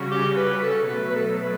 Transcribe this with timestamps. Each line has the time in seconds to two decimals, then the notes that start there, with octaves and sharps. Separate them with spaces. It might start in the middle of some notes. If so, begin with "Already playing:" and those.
Already playing: C#3 G3 C#4 F#4
0.11 G4
0.37 B4
0.63 A4
0.89 B2 F#3 A3 B4
1.11 B4
1.15 A4
1.42 B4